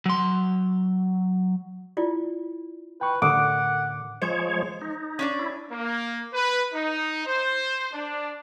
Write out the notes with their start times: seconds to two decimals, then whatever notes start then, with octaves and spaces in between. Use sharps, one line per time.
0.06 F#3 C6
1.97 E4 F4 D5
3.01 B4 G5 C#6
3.22 A2 D3 A4 A#4 F#5 D6
4.22 F3 G#3 C5 C#5
4.81 D#4
5.19 C#4 D4 D5
5.39 E4
5.72 A#3
6.34 B4
6.74 D#4
7.27 C5
7.94 D4